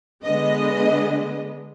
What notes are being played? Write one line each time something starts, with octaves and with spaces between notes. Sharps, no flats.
D3 G#3 B3 D#5